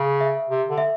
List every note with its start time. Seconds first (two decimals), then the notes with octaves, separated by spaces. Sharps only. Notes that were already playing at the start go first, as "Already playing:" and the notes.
Already playing: C#3
0.21 E5
0.49 C3
0.69 D3
0.78 E5